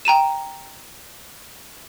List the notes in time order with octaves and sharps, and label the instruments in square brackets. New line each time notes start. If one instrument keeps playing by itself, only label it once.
[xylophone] G5 A#5 D#7 E7